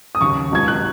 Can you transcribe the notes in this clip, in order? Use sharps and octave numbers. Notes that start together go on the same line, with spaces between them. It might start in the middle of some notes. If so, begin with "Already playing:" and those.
D#6
D#2 C#3 F#3 C#6
C#2 B2 F#3 G#6
F#6